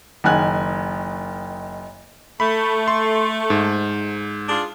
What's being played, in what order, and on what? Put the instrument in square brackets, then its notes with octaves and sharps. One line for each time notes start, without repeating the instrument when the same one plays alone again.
[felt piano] F#1 D#3 G#5 F#6
[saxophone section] A3 [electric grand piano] B5
[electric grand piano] C6
G#2
[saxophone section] D4 F4 G#4